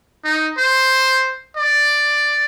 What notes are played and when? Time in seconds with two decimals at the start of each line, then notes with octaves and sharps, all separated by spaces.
0.25 D#4
0.58 C5
1.57 D5